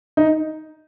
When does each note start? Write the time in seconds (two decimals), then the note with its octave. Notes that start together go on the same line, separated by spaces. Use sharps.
0.17 D#4